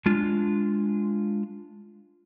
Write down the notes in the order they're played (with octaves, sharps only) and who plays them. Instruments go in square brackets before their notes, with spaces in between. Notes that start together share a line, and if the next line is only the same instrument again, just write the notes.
[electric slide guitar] G#3 D4 F4